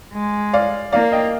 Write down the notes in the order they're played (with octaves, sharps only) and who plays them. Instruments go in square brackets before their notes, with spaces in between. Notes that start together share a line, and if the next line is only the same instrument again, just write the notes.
[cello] G#3
[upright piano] D5 F5
[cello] A#3 [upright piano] D5 F5
[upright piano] D#5 G5